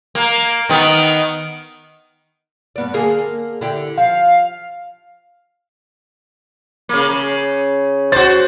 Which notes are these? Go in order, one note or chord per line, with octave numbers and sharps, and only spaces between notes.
A#3
D#3 B3
G2 B3 D5
D3 A#3 G#4
D3 E4 G4
F3 F5
C#3 A#3
C#3
F#4 C5 A6